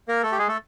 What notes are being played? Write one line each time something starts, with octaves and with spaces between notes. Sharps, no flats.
A#3 A#4
A3 A4
G4
G#3 G#4
A3 A4